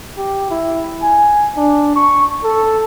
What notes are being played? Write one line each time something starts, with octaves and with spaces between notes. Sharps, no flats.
G4
E4
G#5
D4
C#6
A4